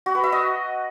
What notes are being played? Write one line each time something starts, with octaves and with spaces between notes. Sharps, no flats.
F#4
B4
E5
D#5